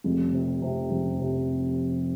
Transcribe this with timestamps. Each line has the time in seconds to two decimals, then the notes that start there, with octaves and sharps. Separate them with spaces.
0.04 F1
0.33 C3
0.62 C3
0.90 F1
1.19 C3